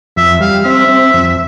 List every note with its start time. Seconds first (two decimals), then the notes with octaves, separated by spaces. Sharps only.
0.16 F2 E5
0.40 G3 F5
0.65 C4 E5
0.89 C4
1.14 F2